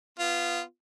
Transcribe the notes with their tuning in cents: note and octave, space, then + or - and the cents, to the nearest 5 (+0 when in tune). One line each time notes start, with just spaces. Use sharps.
B3 +5 F4 -15